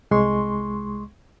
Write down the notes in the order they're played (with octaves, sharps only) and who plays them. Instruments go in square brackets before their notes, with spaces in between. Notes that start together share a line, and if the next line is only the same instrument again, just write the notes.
[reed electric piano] C2 G#3 C6 C#6